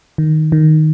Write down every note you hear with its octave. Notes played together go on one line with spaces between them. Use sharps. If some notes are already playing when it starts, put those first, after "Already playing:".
D#3
D#3